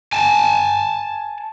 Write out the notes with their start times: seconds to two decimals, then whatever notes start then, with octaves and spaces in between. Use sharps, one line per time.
0.13 G#5 A5